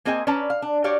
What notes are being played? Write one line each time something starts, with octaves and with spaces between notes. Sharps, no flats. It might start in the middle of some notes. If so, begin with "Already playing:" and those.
A#3 C4 G#4 D#5 G5 G#5
C#4 B4 D5 A5 A#5
F5
D4
F#4 G4 C#5 D5 F5